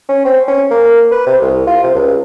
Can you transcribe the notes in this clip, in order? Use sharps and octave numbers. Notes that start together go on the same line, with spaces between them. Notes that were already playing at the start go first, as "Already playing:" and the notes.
C#4
C4
C#4
A#3
B4
C3
C2
F4
C3
C#2